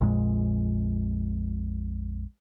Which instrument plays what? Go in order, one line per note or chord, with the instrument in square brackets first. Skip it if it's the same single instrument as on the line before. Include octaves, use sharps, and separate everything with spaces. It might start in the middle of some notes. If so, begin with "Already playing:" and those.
[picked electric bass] A#1 F2 A#2 G#3